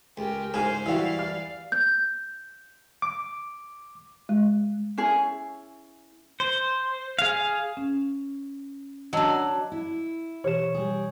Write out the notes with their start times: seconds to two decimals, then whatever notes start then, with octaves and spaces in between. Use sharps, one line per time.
0.17 C#2 G4 A#4
0.54 G#2 C#3 D#4 C5 G#5 F6
0.86 E3 G3 E4 F#4 D5 F5
1.19 F6
1.72 G6
3.02 D6
4.29 G#3
4.98 C#4 E4 G#4
6.40 C5
7.19 G#4 F5
7.77 C#4
9.13 F#3 D4 D#5 A5 E6
9.72 E4
10.44 B2 E3 G4 C#5 E7
10.74 G3 G#4